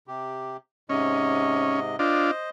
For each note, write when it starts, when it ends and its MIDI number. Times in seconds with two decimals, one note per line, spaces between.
0.08 0.57 48
0.08 0.57 67
0.89 1.96 44
0.89 1.96 48
0.89 1.80 61
0.89 1.96 75
1.99 2.31 62
1.99 2.31 65
1.99 2.50 72
1.99 2.50 75